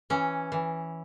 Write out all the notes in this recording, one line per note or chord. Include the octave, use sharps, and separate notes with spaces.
E3 C#4
E3